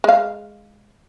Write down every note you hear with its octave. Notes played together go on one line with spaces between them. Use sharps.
G#3 F5